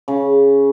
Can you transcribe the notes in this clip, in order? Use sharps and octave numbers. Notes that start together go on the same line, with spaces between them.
C#3